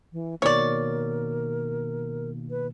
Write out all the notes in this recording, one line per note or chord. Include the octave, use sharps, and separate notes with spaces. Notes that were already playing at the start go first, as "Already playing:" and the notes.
E3
B2 D#3 A#3 A#4 C#5 D5
B4